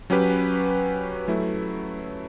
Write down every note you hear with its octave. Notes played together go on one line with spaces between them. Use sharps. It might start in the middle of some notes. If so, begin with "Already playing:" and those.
F#3 C#4 G4 B4
F#3 A3 E4